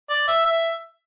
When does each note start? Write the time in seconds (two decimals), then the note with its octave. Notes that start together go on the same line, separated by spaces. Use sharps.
0.10 D5
0.28 E5
0.45 E5